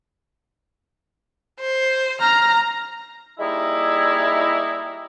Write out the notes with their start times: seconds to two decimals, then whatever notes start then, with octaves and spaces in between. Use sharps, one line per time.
1.61 C5
2.21 A#5 F6
3.39 G3 G#3 A#3 D#4 E4